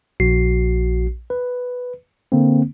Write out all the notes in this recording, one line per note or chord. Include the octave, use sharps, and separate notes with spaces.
A#1 F#4 C7
B4
D3 A#3 C4